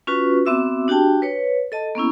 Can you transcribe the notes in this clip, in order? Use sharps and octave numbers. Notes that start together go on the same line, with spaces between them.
C#4 F4 F#4 B4
B3 C4 F#4 E5 D6 E6
D4 F#4 G4 G5 A5
B4 C#5
A4 D#5 A5
A#3 B3 C#4 E4